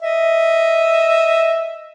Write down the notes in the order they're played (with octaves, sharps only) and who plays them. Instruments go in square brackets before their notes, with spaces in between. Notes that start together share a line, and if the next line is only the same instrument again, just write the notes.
[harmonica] D#5 E5